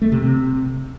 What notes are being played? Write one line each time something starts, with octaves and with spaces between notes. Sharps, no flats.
A3
C3
C3